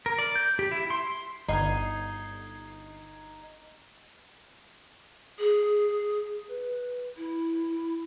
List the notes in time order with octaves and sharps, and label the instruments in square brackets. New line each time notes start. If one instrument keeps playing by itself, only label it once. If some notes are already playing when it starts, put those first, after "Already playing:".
[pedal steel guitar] A#4
D5
G6
G4
E4
C6
[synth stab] G1 G#6 C7 [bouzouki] D#4
[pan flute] G#4
B4
E4